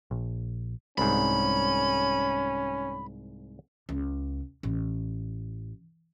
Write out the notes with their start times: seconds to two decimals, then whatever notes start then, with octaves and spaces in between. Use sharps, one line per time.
0.11 A#1
0.98 C2 G#2 C#4 B5
3.89 C#2
4.63 A1